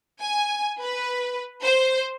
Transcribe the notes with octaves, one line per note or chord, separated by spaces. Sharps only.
G#5
B4
C5